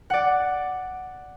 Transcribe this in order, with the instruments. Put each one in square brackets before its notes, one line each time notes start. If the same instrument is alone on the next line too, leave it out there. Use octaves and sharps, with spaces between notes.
[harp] D5 F#5